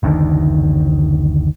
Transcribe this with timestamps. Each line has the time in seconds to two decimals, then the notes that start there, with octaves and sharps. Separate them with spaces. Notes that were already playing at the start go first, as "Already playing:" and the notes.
0.03 F#1 D2 D#3 D4